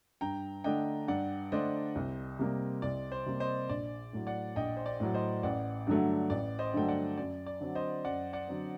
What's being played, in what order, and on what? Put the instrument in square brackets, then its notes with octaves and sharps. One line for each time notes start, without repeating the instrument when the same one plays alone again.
[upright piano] G2 [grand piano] G5 A#5
[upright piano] D3 A3 D4 [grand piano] D#5 G5
[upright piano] G2 [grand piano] D5 F#5
[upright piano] D3 A3 D4 [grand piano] C5 D#5
[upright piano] C2
C3 G3 A#3
[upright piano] C2 [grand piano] D5
[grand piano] C5
[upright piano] C3 G3 A#3
[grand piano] C5 D#5
[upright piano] A#1 [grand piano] D5
[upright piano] A2 F#3
[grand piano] D5 F#5
[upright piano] A#1 [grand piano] D#5 G5
[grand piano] C5
D5
[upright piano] A2 F#3
[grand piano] C5 D#5
[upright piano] A1 [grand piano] D5 F#5
[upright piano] G2 D3 F#3 A3
[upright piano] A1 [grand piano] D5
[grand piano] C5 D#5
[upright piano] G2 D3 F#3 A3 [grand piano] G5
[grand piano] D5 F#5
[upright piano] F#2 [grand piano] D5
[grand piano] D5
[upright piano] D3 F#3 C4
[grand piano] C5 D#5
[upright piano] F#2 [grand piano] D5 F#5
[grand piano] D5 F#5
[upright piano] D3 F#3 C4